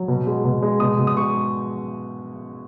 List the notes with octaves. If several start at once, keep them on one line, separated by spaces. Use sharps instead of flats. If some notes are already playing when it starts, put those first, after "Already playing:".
Already playing: F#3
B2
G#3
B2
G#3
B2 D#6
B2
D#6
G#3 C#6